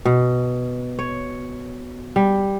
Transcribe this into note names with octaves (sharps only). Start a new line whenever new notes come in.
B2
C#5
G3